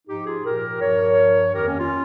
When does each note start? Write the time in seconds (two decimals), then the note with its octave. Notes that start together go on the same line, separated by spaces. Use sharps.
0.07 G#2 F3 D#4 G4
0.25 F4 G#4
0.44 A#2 F3 G4 A#4
0.81 G2 F3 A#4 C#5
1.17 G2 F3
1.53 F2 D#3 G4 A#4
1.66 A#3 C#4
1.78 C#4 F4